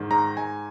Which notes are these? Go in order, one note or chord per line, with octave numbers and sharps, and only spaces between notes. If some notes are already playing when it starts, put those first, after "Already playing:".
Already playing: G#2 D#3
G#2 A#5
G#2 G#5